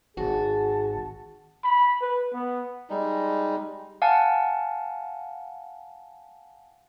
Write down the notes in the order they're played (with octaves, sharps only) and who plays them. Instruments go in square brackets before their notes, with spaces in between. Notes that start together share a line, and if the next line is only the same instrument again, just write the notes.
[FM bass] G#1 [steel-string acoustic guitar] F#4 [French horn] G#4 [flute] A5
[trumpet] B5
B4
B3
[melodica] G3 G#3 D#4
[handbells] F5 F#5 G#5 A5